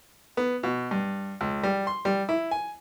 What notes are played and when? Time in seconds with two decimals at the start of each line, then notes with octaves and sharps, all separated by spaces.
0.37 B3
0.63 B2
0.91 G2
1.41 C#2
1.63 G3
1.87 C6
2.05 G3
2.29 E4
2.51 G#5